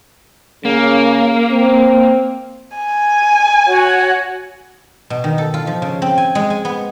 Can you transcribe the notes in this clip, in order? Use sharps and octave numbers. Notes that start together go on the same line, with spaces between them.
C#3 A#3
C4
G#5
F#4 C#5 F#5
B2
D#3
A4
F4
F3
C#3
C4
G#5
G#3
G#5
B3